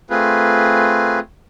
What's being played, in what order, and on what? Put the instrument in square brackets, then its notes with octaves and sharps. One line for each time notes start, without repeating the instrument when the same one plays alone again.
[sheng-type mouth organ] A3 C4 F4 G#4 B4